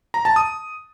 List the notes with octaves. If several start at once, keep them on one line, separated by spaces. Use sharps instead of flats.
A#5
A5
D#6